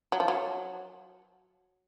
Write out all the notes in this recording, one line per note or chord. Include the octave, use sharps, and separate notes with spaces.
F#3
F3
F#3